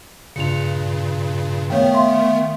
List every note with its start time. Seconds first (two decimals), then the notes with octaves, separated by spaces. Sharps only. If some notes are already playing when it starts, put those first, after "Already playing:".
0.36 G2 A#2 C#3 C#7 F7
1.70 D#3 A3 B3 C#5 F5 G5
1.94 E5 F5 C6